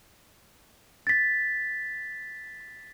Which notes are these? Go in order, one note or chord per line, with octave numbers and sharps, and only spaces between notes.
A6 B6